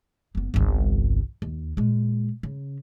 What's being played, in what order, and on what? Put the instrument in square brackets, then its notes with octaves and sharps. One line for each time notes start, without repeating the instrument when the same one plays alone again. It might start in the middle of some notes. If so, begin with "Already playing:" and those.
[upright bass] F#1 B3
G1 C2
D#2
A#2 G#3
C#3